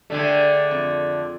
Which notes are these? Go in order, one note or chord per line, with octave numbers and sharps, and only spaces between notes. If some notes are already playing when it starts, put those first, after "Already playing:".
D3 A3 D4 G4 G#4
F2